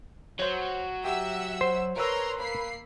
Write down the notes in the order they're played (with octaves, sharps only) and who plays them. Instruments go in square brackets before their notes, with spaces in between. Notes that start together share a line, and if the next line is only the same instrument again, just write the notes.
[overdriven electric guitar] F#3 [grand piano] C5 C#5
[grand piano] G4 [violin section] E5 F#5 E6
[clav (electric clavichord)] C5
[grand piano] A#4 B4 E6 [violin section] C#5 A#5 C6
[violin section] A#3 B5 C7